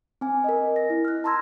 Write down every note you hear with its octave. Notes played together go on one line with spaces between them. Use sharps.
C4 G#5
A#4 D#5
A#6
E4
F6 F#6
A5 A#5 C6 E6 G#6 A#6